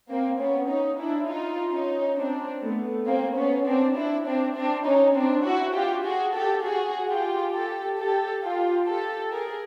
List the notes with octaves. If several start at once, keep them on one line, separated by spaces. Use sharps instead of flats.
A#3 C4
B3 C#4
C#4 D#4
D4 E4
D#4 F4
C#4 D#4
C4 D4
A3 B3
A#3 C4
B3 C#4
C4 D4
D4 E4
C4 D4
C4 D4
C#4 D#4
C4 D4
E4 F#4
F4 G4
F#4 G#4
G4 A4
F#4 G#4
F4 G4
G4 A4
G4 A4
F4 G4
G4 A4
G#4 A#4